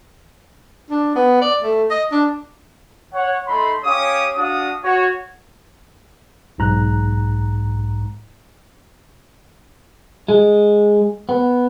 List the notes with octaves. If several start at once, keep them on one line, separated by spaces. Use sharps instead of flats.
D4
B3
D5
A3
D#5
D4
C#5 F#5
A3 D#4 B5 C6
C#4 G4 C#5 F5 D6 D#6
D4 F#4 D5 F5 D#6
F#4 C#5
B1 G#2 A#5 F#6
G#3
B3